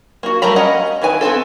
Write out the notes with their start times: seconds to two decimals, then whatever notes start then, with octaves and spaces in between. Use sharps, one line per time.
0.23 A#3 F#4
0.42 G3 A3 A#4 A#5 B5
0.56 C#4 D#5 F#5 A#5
1.02 D#3 E4 B4 G#5
1.21 B3 C4 F4 A4